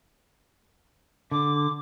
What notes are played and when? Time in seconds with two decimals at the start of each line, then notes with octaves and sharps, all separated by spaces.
1.31 D3 D6